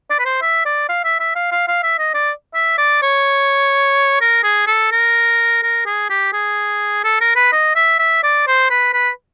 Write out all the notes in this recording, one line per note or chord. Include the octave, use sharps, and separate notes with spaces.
D5
B4
C5
E5
D5
F5
E5
E5
F5
F5
F5
E5
D#5
D5
E5
D5
C#5
A#4
G#4
A4
A#4
A#4
G#4
G4
G#4
A4
A#4
B4
D#5
E5
E5
D5
C5
B4
B4